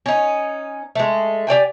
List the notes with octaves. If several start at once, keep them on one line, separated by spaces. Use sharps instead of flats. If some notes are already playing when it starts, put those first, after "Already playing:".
C#4 D#4
G#3 A3
G4 D5 G5 G#5